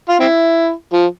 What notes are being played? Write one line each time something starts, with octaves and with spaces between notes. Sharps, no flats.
F4
C4 E4
F3